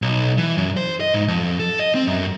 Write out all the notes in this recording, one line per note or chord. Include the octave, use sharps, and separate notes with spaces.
B1
E3
F#2
C5
D#5
G#2
F2
A4
D#5
C4
F#2